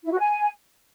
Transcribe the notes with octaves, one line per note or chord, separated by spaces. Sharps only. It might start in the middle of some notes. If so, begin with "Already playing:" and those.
E4
F#4
G#5